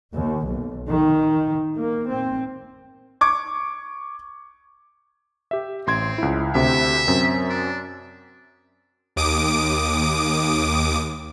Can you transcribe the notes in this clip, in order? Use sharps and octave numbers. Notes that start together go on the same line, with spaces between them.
D#2
B1
D#3
A#3
C4
C#6 D6 G#6
G4 E5
A1 C4 C6 G#6
C#2 E4
D2 C3 E5
F#2 C4
D4
D#2 D6 D#6 D7